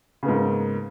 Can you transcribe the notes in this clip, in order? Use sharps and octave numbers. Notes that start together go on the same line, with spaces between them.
G#2 C#3 A#3 B3